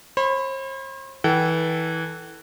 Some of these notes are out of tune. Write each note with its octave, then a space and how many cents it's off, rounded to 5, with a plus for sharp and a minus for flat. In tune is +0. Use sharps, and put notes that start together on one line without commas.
C5 +45 B5 +15
E3 -20 A4 +0 G5 -45